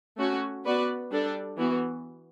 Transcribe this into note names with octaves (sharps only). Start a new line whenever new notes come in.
A3 C#4 F#4
B3 F#4 B4 D5
G3 D4 A4 D5
E3 B3 F#4